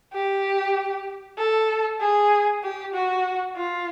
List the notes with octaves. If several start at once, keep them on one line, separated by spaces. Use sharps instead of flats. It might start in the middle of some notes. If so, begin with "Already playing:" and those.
G4
A4
G#4
G4
F#4
F4